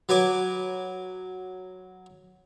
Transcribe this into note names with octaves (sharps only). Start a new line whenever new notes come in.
F#3 B4 G#5 D6